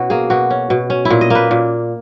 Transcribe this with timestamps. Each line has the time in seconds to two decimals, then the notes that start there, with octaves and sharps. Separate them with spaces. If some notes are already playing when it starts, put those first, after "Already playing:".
Already playing: B2 C#4 E4 F#4
0.10 A#3 G#4
0.30 B2 F#4
0.50 C#4
0.70 B2
0.90 C#4
1.05 E4
1.10 A#2
1.21 D#5
1.30 A#3 B4
1.51 A#2